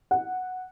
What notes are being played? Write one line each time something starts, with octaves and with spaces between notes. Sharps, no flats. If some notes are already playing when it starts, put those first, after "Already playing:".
F#5